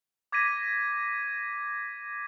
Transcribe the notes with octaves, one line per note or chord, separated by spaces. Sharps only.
D6 G#6 A#6 B6 D#7